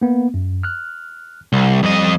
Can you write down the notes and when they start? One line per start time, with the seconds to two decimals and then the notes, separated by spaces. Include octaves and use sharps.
0.02 A#3 B3
0.34 F#2
0.63 F6 F#6
1.53 C2 G3
1.83 F2 D#5